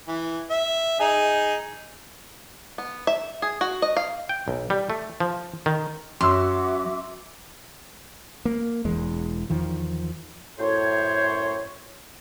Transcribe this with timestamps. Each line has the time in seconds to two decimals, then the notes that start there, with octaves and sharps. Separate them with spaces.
0.08 E3
0.50 E5
1.00 D#4 G#4
2.78 B3
3.07 E5
3.42 G#4
3.61 F#4
3.82 D#5
3.97 F5
4.29 G5
4.48 B1
4.70 G3
4.90 A3
5.20 F3
5.66 D#3
6.21 F#2 F#4 E5 C6 D6 E6
8.45 A#3
8.85 E1 E2 G#3
9.50 E2 D#3 F3
10.59 F#2 A2 C5 C#5